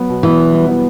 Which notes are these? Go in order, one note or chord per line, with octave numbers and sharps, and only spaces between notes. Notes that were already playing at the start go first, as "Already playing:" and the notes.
Already playing: F#3 B3
B2
B2 E3
B3
G3
B3